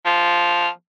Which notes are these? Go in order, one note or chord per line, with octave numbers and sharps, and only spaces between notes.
F3